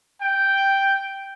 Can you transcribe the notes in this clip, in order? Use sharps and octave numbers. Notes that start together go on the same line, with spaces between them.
G5